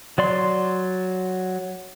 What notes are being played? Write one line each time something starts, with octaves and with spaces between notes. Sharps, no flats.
F#3 D5 C6